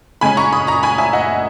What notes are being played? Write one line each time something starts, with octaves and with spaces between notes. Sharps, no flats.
C#3 G#3 C#4 G#5 B5
A#5 C#6
B5 D#6
A#5 C#6
G#5 B5
E5 G#5
D#5 F#5